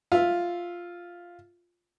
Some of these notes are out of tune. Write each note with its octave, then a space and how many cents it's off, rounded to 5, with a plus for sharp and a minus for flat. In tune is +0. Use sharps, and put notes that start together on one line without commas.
F4 +0 E5 +0